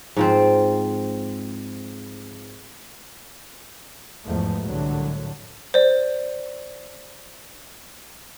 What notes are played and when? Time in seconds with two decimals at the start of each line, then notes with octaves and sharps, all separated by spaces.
0.16 G#2 F3 C4
4.24 E2 G#2 F3 A3
4.61 C2 A2 D3 F#3
5.74 C5 D5